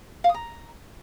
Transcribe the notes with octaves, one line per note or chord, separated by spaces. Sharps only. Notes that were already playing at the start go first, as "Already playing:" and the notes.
F5
D#6
A#5